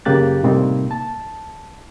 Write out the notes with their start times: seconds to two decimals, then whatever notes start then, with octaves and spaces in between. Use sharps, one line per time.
0.05 F#2 C#3 A#3 G4 F#6 A6
0.43 A2 C3 G3 A#3 C4 D#4
0.91 A5